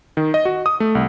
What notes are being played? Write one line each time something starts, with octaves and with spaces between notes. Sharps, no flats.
D#3
D#5
F#4
D#6
A3
C2